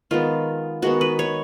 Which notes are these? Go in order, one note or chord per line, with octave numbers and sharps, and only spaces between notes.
D#3 G#3 B3 F4
D#3 G#3 B3 F#4
B4
C#5